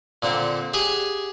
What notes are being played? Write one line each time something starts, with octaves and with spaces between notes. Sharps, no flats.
A#2 D3 C4
G4 G#4 F#5 G#5